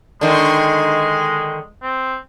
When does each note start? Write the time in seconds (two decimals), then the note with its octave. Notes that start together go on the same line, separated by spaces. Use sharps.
0.21 D3 D#3 G#3
1.82 C4